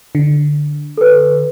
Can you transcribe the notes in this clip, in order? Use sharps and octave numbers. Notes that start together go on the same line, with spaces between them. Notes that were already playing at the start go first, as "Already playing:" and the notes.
D3
A4 B4